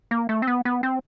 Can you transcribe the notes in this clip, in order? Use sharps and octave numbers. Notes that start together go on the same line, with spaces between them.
A#3
A3
C4
B3
B3
C4